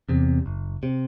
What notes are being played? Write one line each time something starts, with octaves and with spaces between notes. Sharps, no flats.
E2 C3
F#1
C3